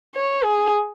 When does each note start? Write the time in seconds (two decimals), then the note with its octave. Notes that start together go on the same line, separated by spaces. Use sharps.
0.15 C#5
0.44 G#4